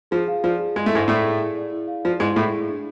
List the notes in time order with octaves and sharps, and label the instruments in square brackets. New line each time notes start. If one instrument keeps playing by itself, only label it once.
[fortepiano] F3 [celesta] G#4
[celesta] F5
[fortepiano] F3 [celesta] D5
[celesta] G#4
[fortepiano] G#3 [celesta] G#4
[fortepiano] A3
[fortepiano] G#2 G#3 [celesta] E4
[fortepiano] A2 A3 [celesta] D5
[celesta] G#4
E4
D5
E4
F5
[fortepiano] F3 [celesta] D5
[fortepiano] G#2 G#3 [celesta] E4
[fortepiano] A2 A3 [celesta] G#4
[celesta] G#4
D4